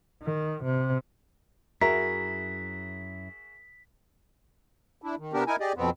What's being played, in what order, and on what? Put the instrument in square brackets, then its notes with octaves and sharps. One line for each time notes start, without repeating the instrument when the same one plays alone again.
[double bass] D#3
C3
[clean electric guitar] F#2 E4 A#5 [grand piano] F#4 G#4 E5 [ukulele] A#4 [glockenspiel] B6
[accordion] D4 E4
D#3
C3 B3 D4 G4 A#4
D#4 E4 A#4 G#5
G4 G#4 D5 D#5
F2 B2 B3 C4